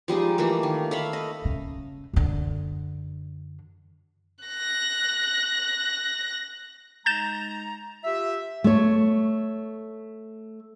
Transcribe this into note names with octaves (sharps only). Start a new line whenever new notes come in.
F3 G3 G#3 D#4
E3 G3 A3 A#3
D#3
A3 E5 F5 B5
D#5
C#3
F#2 D3
F#6 A#6
G#3 D#4 A#5 G6 A6 E7
F4 G4 E5
A3 C#5